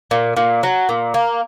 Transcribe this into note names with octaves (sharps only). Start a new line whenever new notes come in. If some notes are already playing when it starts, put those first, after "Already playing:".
A#2
A#2
F#3
A#2
A#3